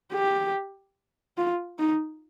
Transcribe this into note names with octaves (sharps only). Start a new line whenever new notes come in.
G4
F4
D#4